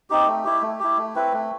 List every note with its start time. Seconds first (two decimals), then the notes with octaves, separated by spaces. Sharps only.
0.10 C4 D#4 G4
0.27 A3
0.45 E4 G4
0.62 A3
0.80 E4 G4
0.97 A3
1.15 C4 E4 B4
1.33 A3